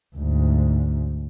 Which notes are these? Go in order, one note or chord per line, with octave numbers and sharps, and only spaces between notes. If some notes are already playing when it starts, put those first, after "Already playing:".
D2 G#2